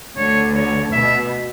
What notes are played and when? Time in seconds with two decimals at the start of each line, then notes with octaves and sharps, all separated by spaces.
0.16 D2 D3 C#5
0.55 C#5
0.93 B2 E5